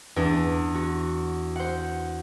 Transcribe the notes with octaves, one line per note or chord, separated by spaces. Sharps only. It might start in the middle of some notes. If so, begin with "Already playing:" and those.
E2 D4
F#4
C5 F#5